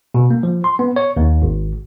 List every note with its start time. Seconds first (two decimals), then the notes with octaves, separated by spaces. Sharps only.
0.14 B2
0.31 A#3
0.43 F3
0.64 C6
0.79 B3
0.96 C#5
1.17 D#2
1.42 G#1